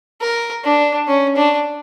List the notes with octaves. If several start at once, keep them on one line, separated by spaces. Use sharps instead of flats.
A#4
D4
C#4
D4